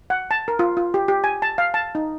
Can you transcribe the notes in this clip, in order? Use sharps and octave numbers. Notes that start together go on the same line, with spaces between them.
F#5
A5
A#4
F4
F4
G4
G4
G#5
A5
F5
A5
D#4